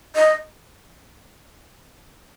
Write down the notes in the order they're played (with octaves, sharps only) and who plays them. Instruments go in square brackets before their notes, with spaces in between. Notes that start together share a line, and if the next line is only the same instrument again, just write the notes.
[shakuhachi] D#5